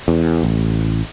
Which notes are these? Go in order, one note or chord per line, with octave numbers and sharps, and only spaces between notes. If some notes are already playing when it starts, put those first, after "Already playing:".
E2
A1